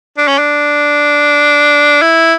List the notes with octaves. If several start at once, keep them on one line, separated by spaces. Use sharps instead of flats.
D4
C#4
D4
E4